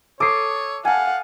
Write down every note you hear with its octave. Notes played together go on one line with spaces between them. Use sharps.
A4 C#5 D6 D#6 C7
F5 F#5 G#5 A5